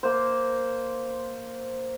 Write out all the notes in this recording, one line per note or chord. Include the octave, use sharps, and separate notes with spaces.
A#3 C5